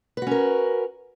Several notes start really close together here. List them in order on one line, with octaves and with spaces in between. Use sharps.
B4 F#4 C#4 A#4